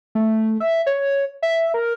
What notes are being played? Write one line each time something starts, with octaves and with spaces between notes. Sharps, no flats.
A3
E5
C#5
E5
A#4